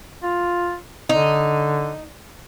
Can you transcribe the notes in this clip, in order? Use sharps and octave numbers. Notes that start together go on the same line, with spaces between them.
F4
D3 D#4